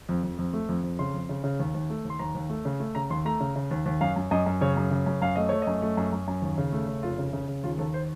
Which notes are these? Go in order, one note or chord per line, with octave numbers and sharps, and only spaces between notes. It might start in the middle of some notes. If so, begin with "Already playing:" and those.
F2
F2
F2
A3
F2
F2
C#3 C6
F2
C#3
C#3
D#2
D#2
A3
D#2 C6
D#2 A#5
D#2
A3
C#3
A3
C#3 A#5
D#2 C6
A3 A#5
C#3
C#3
D#2
D#2
F#2 F5
F#2
F#2 D#5
F#2
C#3 C#5
F#2
C#3
F#2
F#2 F5
A3 D#5
A3 C#5
F#2 D#5
A3
F#2
F#2
F#2
D#2
C#3
A3
C#3
F1 F4
C#3
C#3
C#3
D#2 F4
D#2 A4
C5